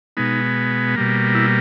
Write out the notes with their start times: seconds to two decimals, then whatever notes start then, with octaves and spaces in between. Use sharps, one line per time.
0.17 B2 G#3 B3 D#4
0.96 B2 G3 A#3
1.35 E4